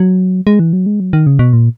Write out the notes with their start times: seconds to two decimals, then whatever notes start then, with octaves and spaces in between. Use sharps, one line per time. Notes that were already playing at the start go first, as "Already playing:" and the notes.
Already playing: F#3
0.47 G#3
0.59 E3
0.73 F#3
0.86 G#3
1.00 F#3
1.13 D#3
1.27 C#3
1.39 B2
1.53 A#2